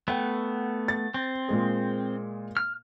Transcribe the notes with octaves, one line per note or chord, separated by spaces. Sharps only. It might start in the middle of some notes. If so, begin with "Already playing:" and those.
A3 B3 F#5 G5
A6
C4
A#2 G#3 G#4
F6